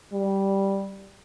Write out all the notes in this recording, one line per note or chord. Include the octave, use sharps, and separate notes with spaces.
G3